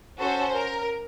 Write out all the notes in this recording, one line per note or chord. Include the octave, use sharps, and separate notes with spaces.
C#4 F#4 A4 C5
A#4